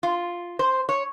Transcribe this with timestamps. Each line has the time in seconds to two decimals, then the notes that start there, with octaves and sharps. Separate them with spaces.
0.03 F4
0.59 C5
0.89 C#5